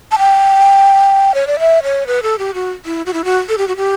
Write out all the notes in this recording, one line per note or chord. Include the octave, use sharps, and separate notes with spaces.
A5
G5
C#5
D5
E5
C#5
B4
A4
G4
F#4
E4
F#4
E4
F#4
A4
G4
F#4
G4